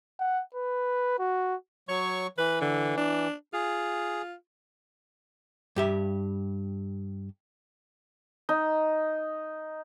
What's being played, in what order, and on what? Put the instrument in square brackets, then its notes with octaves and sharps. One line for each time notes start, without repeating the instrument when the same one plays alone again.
[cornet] F#5
B4
F#4
[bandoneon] F#3 C#6 [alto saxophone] C#5
[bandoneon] E3 [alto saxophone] B4
[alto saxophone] D3
D4
[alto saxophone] F4 [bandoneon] G#4
[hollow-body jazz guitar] G2 G4 E5
[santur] D#4